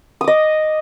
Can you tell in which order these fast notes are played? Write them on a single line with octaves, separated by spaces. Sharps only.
D#6 D6 D#5